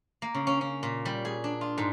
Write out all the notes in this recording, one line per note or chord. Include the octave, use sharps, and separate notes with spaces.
A#3
C#3
C#4
C#4
A#2
G3
G#4
D4
F4
G#2